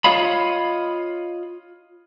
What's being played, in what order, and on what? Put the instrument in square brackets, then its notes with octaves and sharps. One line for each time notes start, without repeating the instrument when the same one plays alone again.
[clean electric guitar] F4 C#5 D#5 F5 B5